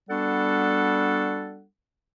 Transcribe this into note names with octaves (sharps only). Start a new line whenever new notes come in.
G3 B3 D4 F#4 A4 F#5